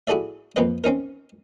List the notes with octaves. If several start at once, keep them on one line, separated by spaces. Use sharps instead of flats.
E4 F#4 G#4 A4 D5 E5
F2 A#3 C4 B4 D#5
C4 C#4 D#4 A#4